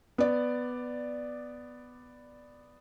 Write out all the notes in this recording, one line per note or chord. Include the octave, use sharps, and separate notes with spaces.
B3 D5